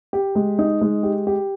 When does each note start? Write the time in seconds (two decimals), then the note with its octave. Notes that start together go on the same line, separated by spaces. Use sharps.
0.13 G4
0.35 G#3
0.59 D#4
0.81 G#3
1.03 G4
1.27 G4